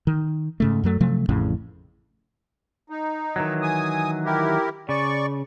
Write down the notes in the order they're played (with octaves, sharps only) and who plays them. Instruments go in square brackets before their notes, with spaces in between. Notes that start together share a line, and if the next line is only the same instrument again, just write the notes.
[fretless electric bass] D#3
G#2 C#3 A3
F#2 F#3 A3
C3 F3 F#3 A3
A1 F2 A2 C#3
[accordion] D#4
[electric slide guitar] D#3 E3 F#3
[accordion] G#5 D#6
E4 G4 A#4
[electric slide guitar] C#3 [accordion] D5 C#6